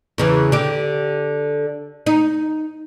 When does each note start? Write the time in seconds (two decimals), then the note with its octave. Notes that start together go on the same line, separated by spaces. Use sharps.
0.18 E2 C#3 E3
0.52 D3 G4
2.06 D#4